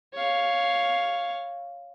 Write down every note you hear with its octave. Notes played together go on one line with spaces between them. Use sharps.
C#5 F5